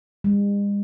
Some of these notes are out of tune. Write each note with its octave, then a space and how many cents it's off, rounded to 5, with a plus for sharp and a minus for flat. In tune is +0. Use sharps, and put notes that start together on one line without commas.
G#3 -45